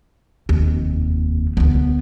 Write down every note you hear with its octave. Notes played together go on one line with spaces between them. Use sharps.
F1 D#2
D2 B3